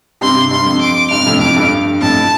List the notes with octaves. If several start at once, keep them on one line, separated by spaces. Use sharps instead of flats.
G2 C3 C6
G2 C6
F2
D6
G2 C3 F6
F2 A2
F2 D6
G2
F2 A2 A5